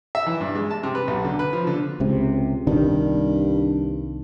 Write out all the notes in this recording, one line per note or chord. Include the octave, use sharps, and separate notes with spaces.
E5
E3
G2
G#3
A5
C3
B4
B1
D3
B4
F3
D3
C#2 C3
C2 G2 D#3 D4